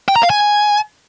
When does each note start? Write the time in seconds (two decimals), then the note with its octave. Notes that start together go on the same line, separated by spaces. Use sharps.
0.08 G5
0.16 A#5
0.23 F5
0.30 G#5